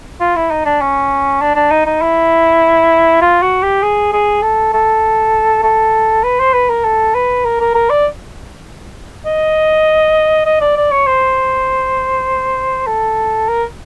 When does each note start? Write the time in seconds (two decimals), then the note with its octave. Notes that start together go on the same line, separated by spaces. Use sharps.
0.20 F4
0.36 E4
0.51 D#4
0.65 D4
0.81 C#4
1.41 D4
1.55 D4
1.71 D#4
1.86 D#4
2.02 E4
3.21 F4
3.42 F#4
3.63 G4
3.82 G#4
4.13 G#4
4.42 A4
4.73 A4
5.63 A4
6.23 B4
6.39 C5
6.53 B4
6.69 A#4
6.84 A4
7.14 B4
7.45 A#4
7.60 A#4
7.75 A#4
7.90 D5
9.25 D#5
10.46 D#5
10.61 D5
10.77 D5
10.91 C#5
11.07 C5
12.87 A4
13.48 A#4